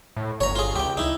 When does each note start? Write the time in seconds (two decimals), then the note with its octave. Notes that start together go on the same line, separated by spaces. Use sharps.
0.17 A2
0.41 G1 C#5 A#5
0.56 F4 G#4
0.75 C#2 G4 G5
0.97 D#4 E4